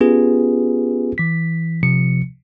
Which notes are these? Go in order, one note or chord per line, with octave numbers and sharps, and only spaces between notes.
B3 C#4 F4 G4 G#4 B4
E3 B6
C3 F3 C#7